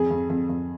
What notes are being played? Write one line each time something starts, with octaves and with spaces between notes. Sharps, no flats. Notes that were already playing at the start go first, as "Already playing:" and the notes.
Already playing: F2 G#4
F2
F2
F2